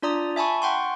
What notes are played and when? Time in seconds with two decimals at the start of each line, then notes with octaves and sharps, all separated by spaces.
0.02 D4 F4 D5 A#5 D#6
0.36 E5 G#5 A5 B5 C#6
0.62 F#5 G5 C6 C#6